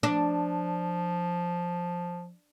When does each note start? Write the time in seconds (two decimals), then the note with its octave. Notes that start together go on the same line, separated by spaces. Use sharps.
0.03 F3 D4